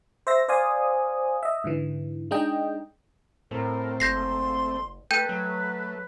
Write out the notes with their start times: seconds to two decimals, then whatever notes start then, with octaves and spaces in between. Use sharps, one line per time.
0.27 C5 E5 A#6
0.48 C5 D5 F5 G#5 D#6
1.43 D#5 E5
1.64 G#2 D3 E3
2.31 G#3 D4 D#4 D#5 G5
3.51 A2 A3 C4 A#4
4.00 F#1 C6 G6 A#6 C7
5.11 A3 A4 B4 G5 G6 D#7
5.29 F#3 A3